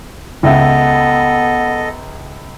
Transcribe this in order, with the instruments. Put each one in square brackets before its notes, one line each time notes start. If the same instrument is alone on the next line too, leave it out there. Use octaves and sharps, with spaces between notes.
[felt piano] C#2 E5 [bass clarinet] B3 [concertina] A4 D#5